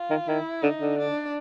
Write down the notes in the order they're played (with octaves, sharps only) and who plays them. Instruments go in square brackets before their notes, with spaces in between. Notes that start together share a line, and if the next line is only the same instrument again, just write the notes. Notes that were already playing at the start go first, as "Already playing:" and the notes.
Already playing: [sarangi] F4
[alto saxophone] D#3
[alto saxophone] D#3 [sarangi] E4
[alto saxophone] D3 [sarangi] D#4
[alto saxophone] D3
[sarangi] D4